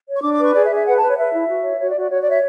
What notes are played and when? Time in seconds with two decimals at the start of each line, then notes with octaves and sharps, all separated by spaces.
0.08 C#5
0.17 C#6
0.23 D4 D6
0.34 D6
0.39 B4
0.44 C#6
0.54 G#4 D5
0.65 E5
0.70 G#4
0.76 E5
0.86 B4 F#5
0.97 A5
1.02 B4
1.07 C#5
1.17 B4 E5
1.33 E4
1.48 F#4
1.64 C#5
1.80 F#4 C#5
1.90 D5
1.95 F#4
2.01 D5
2.10 F#4 C#5
2.22 D5
2.27 C#5 E5